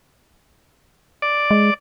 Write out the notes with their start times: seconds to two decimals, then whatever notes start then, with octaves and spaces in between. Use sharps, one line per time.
1.22 D5
1.51 G#3